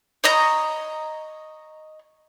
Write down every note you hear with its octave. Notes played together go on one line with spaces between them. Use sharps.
C#5 D#5 A#5